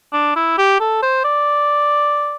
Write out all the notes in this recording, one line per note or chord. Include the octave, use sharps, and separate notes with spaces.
D4
E4
G4
A4
C5
D5